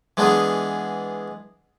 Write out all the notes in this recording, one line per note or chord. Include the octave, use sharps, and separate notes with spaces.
E3 G#3 B3 D4 G#4